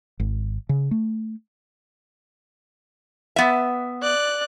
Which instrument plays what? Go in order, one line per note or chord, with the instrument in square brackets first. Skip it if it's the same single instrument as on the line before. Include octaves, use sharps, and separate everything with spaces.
[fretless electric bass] G#1
C#3
A3
[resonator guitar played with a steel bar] B3 E5
[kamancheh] D5 F#6